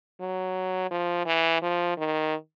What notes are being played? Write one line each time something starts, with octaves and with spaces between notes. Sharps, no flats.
F#3
F3
E3
F3
D#3